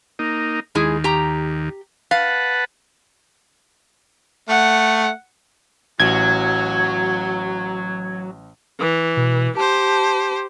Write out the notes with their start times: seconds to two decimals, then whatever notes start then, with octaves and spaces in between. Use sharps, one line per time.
0.19 A#3 D#4
0.75 D#2 G#3 E4 G#4
1.04 G4 A#5
2.11 B4 F5 F#5 A5
4.49 A3 F#5
6.00 A1 F#3 F#4 G#6
8.79 E3
9.17 B2
9.57 G4 C5 A5